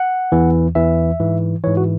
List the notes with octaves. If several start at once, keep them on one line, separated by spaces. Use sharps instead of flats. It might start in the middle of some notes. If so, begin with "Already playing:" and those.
Already playing: F#5
E2 E3
E2 E3 E5
G#2 E3
G#2 E3 C#5
F#4